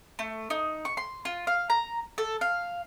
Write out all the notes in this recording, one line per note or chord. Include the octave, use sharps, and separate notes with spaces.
A3
D#4
C#6
C6
F4
F5
A#5
A4
F5